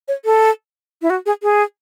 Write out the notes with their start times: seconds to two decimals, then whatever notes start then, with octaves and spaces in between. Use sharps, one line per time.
0.08 C#5
0.25 A4
1.02 E4
1.10 F#4
1.26 G#4
1.43 G#4